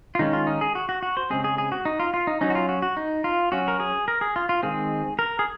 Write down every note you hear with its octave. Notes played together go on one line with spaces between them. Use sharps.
F4
D#3 G#3 C#4 D#4
F4
D#4
G#4
F#4
F#4
F#4
C5
C#3 G#3 C4 G#4
G#4
G#4
F#4
D#4
F4
F4
D#4
F#3 C#4 D#4
F#4
F4
F#4
F#4
D#4
F4
F#3 C#4 F#4
A#4
G#4
A#4
G#4
F4
F4
D#3 G#3 C4 G#4
A#4
G#4